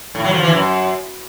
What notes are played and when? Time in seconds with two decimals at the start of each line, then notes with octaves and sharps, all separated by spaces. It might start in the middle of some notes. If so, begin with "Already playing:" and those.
0.15 A2
0.24 F#3
0.34 F3
0.43 E3
0.53 F#2